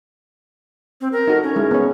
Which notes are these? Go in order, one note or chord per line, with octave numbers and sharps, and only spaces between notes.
C4
A#4
D#4 F#4 A4
C#4
G#3 E4
B3 C#5